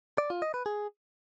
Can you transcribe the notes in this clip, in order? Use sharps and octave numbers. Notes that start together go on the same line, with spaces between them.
D5
F4
D#5
B4
G#4